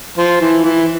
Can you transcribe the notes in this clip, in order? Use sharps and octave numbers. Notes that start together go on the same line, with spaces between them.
F3
E3
E3